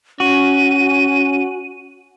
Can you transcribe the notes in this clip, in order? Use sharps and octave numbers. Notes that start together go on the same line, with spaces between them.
C#4 F#4 D#7